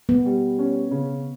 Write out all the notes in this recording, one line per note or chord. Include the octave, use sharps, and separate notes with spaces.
B3
G3
C#4
C#3